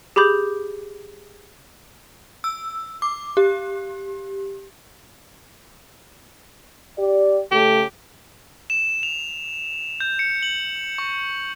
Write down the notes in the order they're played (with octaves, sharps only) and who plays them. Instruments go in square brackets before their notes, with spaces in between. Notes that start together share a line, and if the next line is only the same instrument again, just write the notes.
[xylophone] G4 G#4 B5 D6 G6
[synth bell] E6
D6
G4
[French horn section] G4 D5
[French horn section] C#3 A3 A4 [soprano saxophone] G4
[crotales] E7
F7
G6
C#7
F#7
C#6